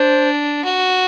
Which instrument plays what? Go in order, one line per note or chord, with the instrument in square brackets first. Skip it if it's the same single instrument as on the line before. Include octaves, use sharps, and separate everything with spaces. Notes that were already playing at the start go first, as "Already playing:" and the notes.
Already playing: [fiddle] D4 [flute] C5
[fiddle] F#4